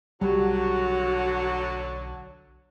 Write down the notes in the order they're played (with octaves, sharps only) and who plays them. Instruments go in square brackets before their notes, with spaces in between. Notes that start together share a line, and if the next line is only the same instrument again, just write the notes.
[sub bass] B1 [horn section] D3 F#3 [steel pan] G3 [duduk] F#4